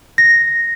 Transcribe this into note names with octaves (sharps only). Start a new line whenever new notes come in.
A#6